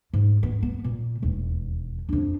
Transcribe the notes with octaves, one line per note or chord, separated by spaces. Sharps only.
G#2
B3
B3
A#2
E1 D#2
F2 D4